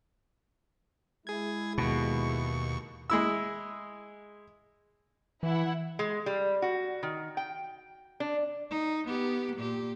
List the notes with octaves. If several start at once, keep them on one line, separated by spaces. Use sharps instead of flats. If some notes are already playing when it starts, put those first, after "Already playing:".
G#3 E4 G#4 G#6
D#2 B2 C#6
G#3 E4 E6
E3 E4 F#5
G#3
G3
F#4
D#3
G5
D4
D#4
B3 G4
A#2 G4